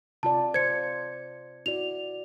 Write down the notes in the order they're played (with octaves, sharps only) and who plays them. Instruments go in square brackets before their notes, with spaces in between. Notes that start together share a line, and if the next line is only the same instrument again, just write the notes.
[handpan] C3 F4 D5 [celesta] A5
[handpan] C5 [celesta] G#6 C#7
[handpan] E4 F#4 D5 [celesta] F7